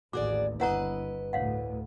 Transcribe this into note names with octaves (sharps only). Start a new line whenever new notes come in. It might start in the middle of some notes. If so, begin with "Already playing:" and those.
A1 D#2 F#4 G#4 D5 D6
G1 E4 B4 C#5 D#5 F#5 A#5
D2 A2 C#5 F5 F#5